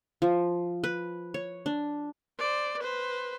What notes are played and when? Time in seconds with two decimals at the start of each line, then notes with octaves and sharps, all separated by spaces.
0.22 F3
0.84 B4
1.34 C#5
1.66 D4
2.38 C5 D5
2.79 B4 C5